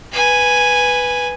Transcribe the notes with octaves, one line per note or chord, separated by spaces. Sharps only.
B4 G#5